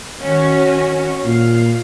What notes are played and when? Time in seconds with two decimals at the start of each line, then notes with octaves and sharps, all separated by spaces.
0.20 D#3 C#4 F#4
1.25 A#2 F5